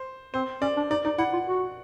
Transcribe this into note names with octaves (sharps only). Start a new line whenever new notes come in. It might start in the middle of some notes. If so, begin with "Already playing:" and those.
Already playing: C5
C4 C5
C#4 D5
D4
D#4 D5
D#4 D5
E4 F#5
F4
F#4